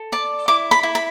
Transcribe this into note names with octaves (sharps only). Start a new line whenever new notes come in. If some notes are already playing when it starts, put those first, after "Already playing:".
Already playing: A4
D5 A5
E4 D6
B5
E4
B5